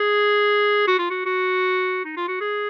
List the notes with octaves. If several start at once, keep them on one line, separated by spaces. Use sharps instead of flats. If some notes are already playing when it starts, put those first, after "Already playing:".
Already playing: G#4
F#4
F4
F#4
F#4
D#4
F4
F#4
G#4